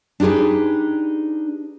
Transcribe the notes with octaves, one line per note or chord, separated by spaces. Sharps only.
D4 D#4 G4 G#4 B4